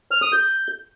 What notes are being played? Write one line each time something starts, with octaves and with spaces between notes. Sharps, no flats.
F6
D#6
G6